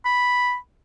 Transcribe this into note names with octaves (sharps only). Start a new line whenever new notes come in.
B5